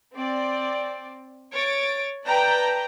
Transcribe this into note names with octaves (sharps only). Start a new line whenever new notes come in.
C4 D5
C#5 A6 D7
B4 D5 G5 A5 A#5 G6